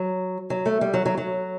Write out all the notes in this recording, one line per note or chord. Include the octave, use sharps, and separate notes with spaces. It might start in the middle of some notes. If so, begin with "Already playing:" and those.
Already playing: F#3
F#3
A3
G3
F#3
F#3
F#3